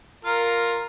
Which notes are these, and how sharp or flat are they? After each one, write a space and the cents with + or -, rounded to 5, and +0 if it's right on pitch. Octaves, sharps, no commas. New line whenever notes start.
F4 +5 A#4 +0